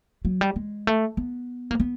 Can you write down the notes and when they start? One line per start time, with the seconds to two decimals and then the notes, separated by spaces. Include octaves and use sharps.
0.25 F#3
0.41 G3
0.56 G#3
0.87 A3
1.17 B3
1.71 A#3
1.80 B3